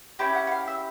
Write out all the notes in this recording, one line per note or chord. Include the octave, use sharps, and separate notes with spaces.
C#4 E4 G4 G5
F#5
F#5
F5
E5